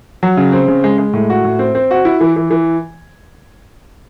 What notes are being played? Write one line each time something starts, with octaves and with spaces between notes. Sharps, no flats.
F#3
C#3
C4
C#3
G#3
G#3
A2
F#4
A2
C4
C4
F#4
E4
E3
E3
E3